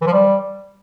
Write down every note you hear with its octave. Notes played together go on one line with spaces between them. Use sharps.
E3
F3
G3